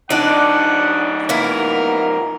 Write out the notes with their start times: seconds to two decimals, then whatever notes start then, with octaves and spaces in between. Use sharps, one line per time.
0.10 F3 D4 D#4 D5 F#5
1.29 A#3 B3 E4 A#4